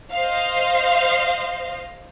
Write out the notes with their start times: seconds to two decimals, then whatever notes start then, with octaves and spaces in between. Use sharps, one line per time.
0.13 C5 D#5 F5